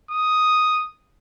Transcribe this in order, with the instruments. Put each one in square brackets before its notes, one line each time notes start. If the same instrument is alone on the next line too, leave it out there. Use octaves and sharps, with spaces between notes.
[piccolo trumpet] D#6